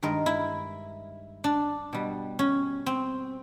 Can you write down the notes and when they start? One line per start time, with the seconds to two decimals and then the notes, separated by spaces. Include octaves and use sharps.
0.02 G2 D#3 G#3 A#4
0.26 E4
1.44 D4
1.93 B2 G3
2.39 C#4
2.86 C4